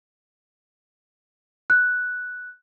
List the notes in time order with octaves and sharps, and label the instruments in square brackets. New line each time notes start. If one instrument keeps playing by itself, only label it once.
[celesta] F#6